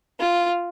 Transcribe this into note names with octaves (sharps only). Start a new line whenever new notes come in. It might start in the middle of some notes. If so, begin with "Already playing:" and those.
F4